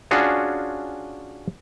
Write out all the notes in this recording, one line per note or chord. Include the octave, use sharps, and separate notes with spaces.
C#4 D4 F4 F#4 G#4 C#5